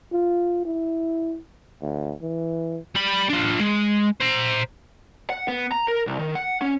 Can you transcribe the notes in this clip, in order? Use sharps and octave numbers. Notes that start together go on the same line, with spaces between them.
F4
E4
D2
E3
G3 B5
D4 F4
G#3
C5 A#5
F#5
B3
A#5
A#4
C2
D#3
F#5
C#4